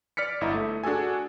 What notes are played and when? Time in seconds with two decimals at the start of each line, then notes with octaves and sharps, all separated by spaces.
0.17 D5 F6 B6 C#7
0.41 G1 E4 D#5 A#5
0.54 A3
0.84 D4 F#4 G#4 A4 G#5